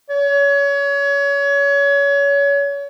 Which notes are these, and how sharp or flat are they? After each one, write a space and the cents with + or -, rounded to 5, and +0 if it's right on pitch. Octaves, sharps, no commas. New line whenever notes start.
C#5 +30